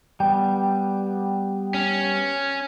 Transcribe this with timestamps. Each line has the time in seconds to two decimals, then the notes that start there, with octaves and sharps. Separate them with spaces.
0.20 G3 B3 G5
1.74 C#4